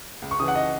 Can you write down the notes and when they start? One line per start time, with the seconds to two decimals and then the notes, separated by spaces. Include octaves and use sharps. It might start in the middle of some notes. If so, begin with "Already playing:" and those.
0.22 C#2
0.31 C#6
0.39 C#3 E3 D#6
0.48 F#5
0.55 D#5